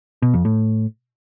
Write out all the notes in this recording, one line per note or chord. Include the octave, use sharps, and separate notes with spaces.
B2
F2
A2